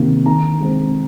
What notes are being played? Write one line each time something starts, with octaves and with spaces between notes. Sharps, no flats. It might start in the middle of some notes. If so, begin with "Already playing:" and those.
Already playing: C3 D#3 A#3
D#3 A#5
G#3 C4